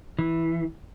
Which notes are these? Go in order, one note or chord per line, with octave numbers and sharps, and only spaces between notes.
E3